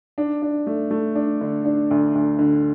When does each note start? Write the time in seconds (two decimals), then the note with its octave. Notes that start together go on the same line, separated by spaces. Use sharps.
0.18 D4
0.42 D4
0.67 A3
0.91 A3
1.15 D4
1.41 D3
1.65 D4
1.91 D2
2.15 D2
2.39 D3